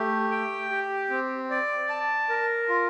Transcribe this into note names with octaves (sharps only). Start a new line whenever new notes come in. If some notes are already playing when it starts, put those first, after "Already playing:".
Already playing: A3 G4
G5
G4
C4
D5
A5
A#4
F4